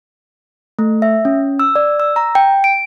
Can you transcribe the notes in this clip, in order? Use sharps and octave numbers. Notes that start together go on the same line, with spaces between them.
A3
E5
C#4
E6
D5
E6
A#5
G5
D7